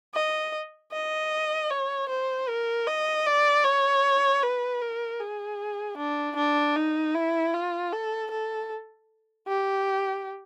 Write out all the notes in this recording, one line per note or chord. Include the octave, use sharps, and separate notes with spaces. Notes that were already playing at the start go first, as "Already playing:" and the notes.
D#5
D#5
C#5
C5
A#4
D#5
D5
C#5
B4
A#4
G#4
D4
D4
D#4
E4
F4
A4
A4
G4